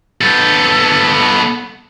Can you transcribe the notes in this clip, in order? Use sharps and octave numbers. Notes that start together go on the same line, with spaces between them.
B3 A4